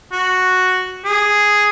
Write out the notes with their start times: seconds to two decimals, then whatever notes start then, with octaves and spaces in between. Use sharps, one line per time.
0.12 F#4
1.05 G#4